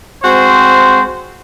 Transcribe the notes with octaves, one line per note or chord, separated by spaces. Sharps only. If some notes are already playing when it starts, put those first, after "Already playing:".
G#3 C4 F#4 C5